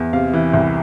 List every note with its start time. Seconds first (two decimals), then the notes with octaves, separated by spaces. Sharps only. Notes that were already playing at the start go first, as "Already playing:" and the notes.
Already playing: E2
0.13 C3 F5
0.33 E3
0.53 C2